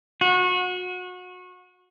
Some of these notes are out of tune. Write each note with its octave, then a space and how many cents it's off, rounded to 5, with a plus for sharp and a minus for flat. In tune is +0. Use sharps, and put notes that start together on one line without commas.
F#4 -30